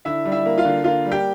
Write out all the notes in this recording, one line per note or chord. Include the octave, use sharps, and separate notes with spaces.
D3 E4 E5
G3
E4 E5
A#3
F4 F5
D3
A#3 F4 F5
G3
G4 G5